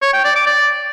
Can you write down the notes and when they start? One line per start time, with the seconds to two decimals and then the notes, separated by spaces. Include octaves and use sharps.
0.02 C#5
0.13 G5
0.24 D5
0.36 D6
0.47 D5